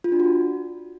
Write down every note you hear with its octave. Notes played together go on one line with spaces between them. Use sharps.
F4
D4
F#4